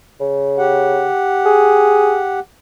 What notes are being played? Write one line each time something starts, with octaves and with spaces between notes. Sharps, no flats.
C#3
G4 F#5
G#4